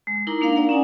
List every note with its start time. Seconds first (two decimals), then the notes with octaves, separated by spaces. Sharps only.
0.07 G#3
0.27 D#4 E4 A#4 A#5 D6
0.41 A#3 D4 A#4 F5 D6
0.56 D5 F5 F#5 A#5
0.69 C#4 D#4 G#5